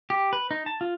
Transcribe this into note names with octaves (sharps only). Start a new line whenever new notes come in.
G4
B4
D#4
A5
F4